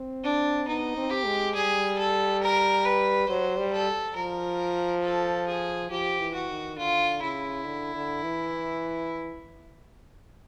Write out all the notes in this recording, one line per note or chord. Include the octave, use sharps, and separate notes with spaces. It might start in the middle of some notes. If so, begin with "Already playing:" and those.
Already playing: C4
D4
B3 D#4
C4
G4
G#3
G3 G#4
A4
A#4
B4
F#3 C5
G3
A4
F3 A#4
A4
G#4
F3 G4
E3
F#4
D#3
D3 F4
C#3 E4
D3
D3
E3